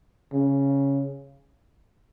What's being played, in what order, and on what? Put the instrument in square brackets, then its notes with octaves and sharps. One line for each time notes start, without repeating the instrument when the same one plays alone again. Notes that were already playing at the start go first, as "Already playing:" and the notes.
[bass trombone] C#3